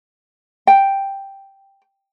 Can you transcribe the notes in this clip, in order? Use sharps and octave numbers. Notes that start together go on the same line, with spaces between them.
G5